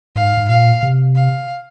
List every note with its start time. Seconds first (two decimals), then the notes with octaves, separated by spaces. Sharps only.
0.16 G#2 F5
0.37 G#2
0.49 A#2 F5
0.83 C3
1.16 F5